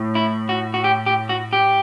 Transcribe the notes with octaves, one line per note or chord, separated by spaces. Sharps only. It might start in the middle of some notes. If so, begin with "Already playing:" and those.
Already playing: A2
E4
F#4
F#4
G4
G4
F#4
G4